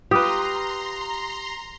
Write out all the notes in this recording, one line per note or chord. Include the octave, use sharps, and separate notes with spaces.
G3 F4 G4 B4 A#5 C6 D#6 G6